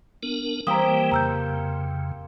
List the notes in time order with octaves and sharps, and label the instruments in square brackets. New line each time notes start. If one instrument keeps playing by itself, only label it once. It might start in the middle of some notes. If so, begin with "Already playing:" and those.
[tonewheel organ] B3 D4 A#4
[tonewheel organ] E3 G3 [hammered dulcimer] A#3 C4 G4 [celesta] A#5 D#6
[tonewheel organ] F2 C#3 [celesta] A#5 E6 G6